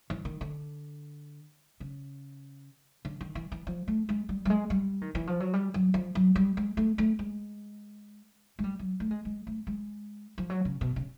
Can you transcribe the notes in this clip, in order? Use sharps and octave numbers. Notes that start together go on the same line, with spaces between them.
E3
D#3
D3
C#3
D3
D#3
E3
E3
F3
A3
G#3
G3
G3
G#3
G3
D#3
E3
F3
F#3
G3
F#3
F3
F#3
G3
G#3
A3
A3
G#3
G#3
G3
F#3
A3
G#3
G#3
A3
G#3
F3
F#3
C#3
B2
C#3